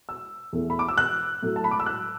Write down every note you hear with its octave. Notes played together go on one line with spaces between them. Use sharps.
E6
E2 E3 A3
B5
D6
E6
F#6
A2 F#3 A3
A5
B5
D6
E6
F#6